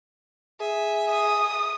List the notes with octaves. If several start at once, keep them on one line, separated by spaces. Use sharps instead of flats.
G#4 E5
D#6